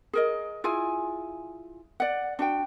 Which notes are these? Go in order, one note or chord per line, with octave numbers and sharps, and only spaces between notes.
G#4 A#4 D#5
E4 F4 G#4 G#5
D5 F#5
D4 F#4 G5